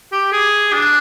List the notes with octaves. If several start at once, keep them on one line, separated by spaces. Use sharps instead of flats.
G4
G#4
D4